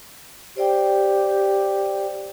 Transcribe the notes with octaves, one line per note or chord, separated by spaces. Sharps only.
G4 C5 D5 G5